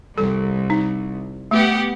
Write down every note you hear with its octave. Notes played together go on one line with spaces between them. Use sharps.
C2 A4
D#4
A3 B3 G4 F#5